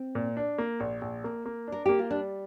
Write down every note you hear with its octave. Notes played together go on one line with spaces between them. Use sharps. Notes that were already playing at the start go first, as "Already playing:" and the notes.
Already playing: C4
A#2
D4
A#3
A#1
A#1
A#3
A#3
D4 A#4
A#3 G4
F4
G3 D4